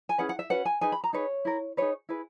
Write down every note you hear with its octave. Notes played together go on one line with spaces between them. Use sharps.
G#5
C#4 E4 G#4 B4 F#5
F#5
E5
C#4 F#4 B4 F#5
G#5
D#4 G#4 B4 G#5
B5
A#5
D#4 G#4 B4 C#5
E4 A#4
D#4 G#4 B4 C#5
E4 G#4 B4